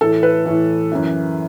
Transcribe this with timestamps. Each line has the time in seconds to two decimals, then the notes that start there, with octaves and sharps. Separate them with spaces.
0.01 A2 E3 A4
0.23 B4
0.45 A2 E3
0.92 F#2 E3